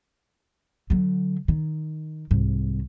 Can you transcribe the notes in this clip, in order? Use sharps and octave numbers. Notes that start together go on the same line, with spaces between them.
D3 F#3
D#3
C2 G#2